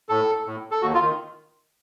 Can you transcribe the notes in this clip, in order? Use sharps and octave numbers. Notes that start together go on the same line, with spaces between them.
A2 A4
A2
A4
D#2 F#4
F4
D#3